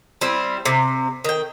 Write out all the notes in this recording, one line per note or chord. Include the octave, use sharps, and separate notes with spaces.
G3 C4 E4
C3
D#3 G5